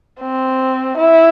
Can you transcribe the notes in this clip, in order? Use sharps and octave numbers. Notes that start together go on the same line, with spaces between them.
C4
E4